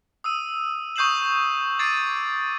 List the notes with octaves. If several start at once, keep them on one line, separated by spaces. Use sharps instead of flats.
D#6 E6 D#7
C#6 D#6 G6 C7 E7 F#7
D6 G#6 A6 C7 D7 D#7